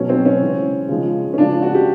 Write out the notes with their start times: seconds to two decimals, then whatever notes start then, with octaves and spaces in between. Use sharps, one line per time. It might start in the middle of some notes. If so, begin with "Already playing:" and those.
Already playing: B2 F#3 A3 C#4
0.09 C4
0.25 C#4
0.40 C#3 E3 G#3
0.89 C#3 F3 G#3
1.33 C#4
1.38 C#3 F3 G#3 D4
1.62 F#4
1.75 G4